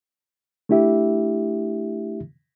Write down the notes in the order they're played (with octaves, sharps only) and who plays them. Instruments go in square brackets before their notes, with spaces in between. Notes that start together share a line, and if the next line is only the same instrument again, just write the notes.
[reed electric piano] A3 D4 E4 G4 E5